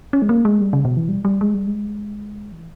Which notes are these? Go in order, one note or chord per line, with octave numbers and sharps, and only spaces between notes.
C#4
G#3
A#3
G#3
G3
C#3
B2
E3
G3
G3
G#3
G3
G#3
E3